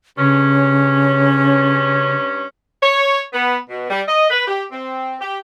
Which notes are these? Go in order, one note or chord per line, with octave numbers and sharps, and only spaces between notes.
G2 C#3 C#4
C#5
B3
B2
G3
D#5
B4
G4
C4
G4